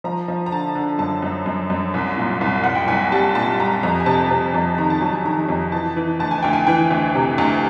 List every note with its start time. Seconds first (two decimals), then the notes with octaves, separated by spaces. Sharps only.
0.04 F3 A#5
0.28 F3
0.46 A#5
0.52 D3 A5
0.75 D3
0.99 F#2 A5
1.22 F#2
1.46 F#2
1.70 F#2
1.94 C2
2.17 A#2
2.41 C2
2.63 C2 F#5
2.75 G5
2.88 C2 G#5
3.12 G3 A5
3.35 A#2 A5
3.59 G3 A#5
3.83 F2 A#5
4.00 G#5
4.06 C3 A5
4.31 C3
4.54 F2 A5
4.78 D#3 A#5
4.90 A5
5.01 F#3 G#5
5.13 A5
5.25 D#3 A#5
5.49 F2
5.72 E3 A5
5.96 E3
6.20 D2 A5
6.31 G#5
6.43 D2 G5
6.53 G#5
6.67 E3 G5
6.91 D2
7.15 C3
7.38 D2